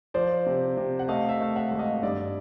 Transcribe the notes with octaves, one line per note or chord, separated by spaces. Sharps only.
F3 C5 D5
C3
C3
F#5
A3 D#5 F5
E5
A3 F5
E5 F#5
G#1
D#5 F5
G2 D5 E5